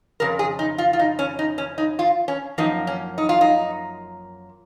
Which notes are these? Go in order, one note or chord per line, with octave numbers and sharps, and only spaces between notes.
F2 C#3 A#4
G#4
D#4
F4
F4
D#4
C#4
D#4
C#4
D#4
F4
C#4
F#2 F3 A#3 D#4
C#4
D#4
F4
D#4